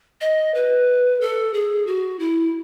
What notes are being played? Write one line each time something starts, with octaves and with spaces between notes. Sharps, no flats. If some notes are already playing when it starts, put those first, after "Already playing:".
D#5
B4
A4
G#4
F#4
E4